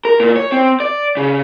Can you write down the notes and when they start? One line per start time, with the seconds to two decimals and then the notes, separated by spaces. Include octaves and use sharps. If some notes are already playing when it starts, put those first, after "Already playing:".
0.05 A#4
0.20 A#2
0.36 C#5
0.52 C4
0.80 D5
1.17 C#3